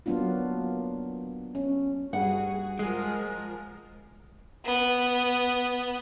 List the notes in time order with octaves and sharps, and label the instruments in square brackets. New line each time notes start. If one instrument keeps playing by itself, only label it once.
[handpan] F#3 A#3 B3 D4 F4
C#4
[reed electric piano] G2 G3 [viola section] F#4 G#4 [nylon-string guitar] F#5
[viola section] F3 A#4 [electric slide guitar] G#3 G#4
[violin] B3